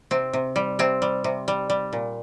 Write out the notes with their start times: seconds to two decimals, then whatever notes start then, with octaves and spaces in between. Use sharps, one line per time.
0.11 C3 C4
0.33 C3
0.56 G3
0.79 C3 C4
1.02 G3
1.24 C3
1.48 G3
1.70 G3
1.93 A#2